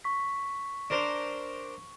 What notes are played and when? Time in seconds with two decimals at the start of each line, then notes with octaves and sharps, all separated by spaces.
0.04 C#6 B6
0.90 D4 A#4 C5